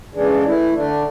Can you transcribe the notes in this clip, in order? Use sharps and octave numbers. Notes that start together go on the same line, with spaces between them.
C#3 E3 G#3 D4
E3 A3 E4
D3 A3 D4